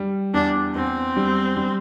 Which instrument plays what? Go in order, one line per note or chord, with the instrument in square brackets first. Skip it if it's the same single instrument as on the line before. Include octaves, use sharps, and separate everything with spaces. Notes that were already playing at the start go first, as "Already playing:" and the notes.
Already playing: [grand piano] G3
[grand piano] E2 [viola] D4
[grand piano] E2 [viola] C4
[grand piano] G3
G3